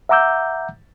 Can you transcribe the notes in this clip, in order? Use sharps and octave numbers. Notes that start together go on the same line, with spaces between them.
E5 F#5 A#5 D6 E6 G6